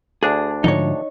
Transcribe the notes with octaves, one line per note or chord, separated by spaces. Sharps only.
D2 D4 G#4
G#2 D3 F3 D#4 C#5